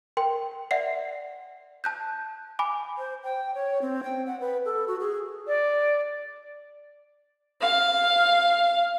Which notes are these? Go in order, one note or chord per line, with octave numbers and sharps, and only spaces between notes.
A#4 G5 C6
D5 E5 F#5 C7
A5 F#6 G6
G#5 B5 D6
C5
G5
C#5
C4
G5
F#5
B4
A4
F#4
G#4
D5
F5